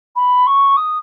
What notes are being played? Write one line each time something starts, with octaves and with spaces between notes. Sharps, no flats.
B5
C#6
D#6